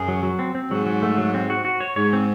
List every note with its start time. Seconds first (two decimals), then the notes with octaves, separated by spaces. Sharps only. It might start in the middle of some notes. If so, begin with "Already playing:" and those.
Already playing: F#2 G#4
0.08 F#3
0.23 F#3
0.39 C4
0.55 C4
0.71 G#2 F#3
0.86 F#3
1.02 A3
1.18 F#3
1.34 C4
1.50 F#4
1.65 F#4
1.80 C#5
1.96 G#2 C#5
2.13 C4